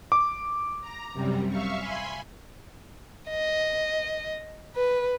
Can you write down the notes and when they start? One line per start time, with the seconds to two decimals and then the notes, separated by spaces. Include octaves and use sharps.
0.12 D6
0.81 A#5
1.13 F#2 C3 G3
1.49 E5 F5 C#6
1.80 G#5 B5 C6
3.29 D#5
4.76 B4